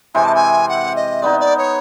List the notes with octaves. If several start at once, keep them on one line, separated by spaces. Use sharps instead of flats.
C3 E3 G#3 C4 G#5
A5
G#5
F#5
D#5
G#3 B3 D#4 D5
D5
C#5